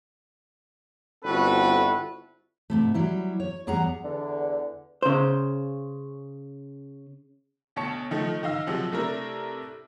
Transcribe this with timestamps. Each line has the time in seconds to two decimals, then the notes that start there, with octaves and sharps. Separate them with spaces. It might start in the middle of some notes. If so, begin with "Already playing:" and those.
1.25 G1 C4 E4 F#4 A4 B4
2.70 G#2 C3 A3
2.95 F#3 G3 E4
3.40 C#5
3.67 E2 G3 G#4 F#5 A#5
4.04 E2 D3
5.03 C#3 C5
7.76 D2 B2 C#5 A5 C#7
8.11 D#3 F3 A3 D#4
8.43 D#3 D#5 F5 E6
8.67 C3 F3 F#3 G#3
8.92 C3 A3 D4 E4 A#4